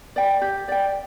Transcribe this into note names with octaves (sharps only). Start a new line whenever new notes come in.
D5 G5
G4
D5 G5